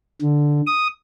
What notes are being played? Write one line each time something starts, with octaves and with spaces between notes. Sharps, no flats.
D3
D#6